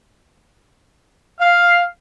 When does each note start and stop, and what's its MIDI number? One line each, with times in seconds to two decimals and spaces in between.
1.40 1.80 77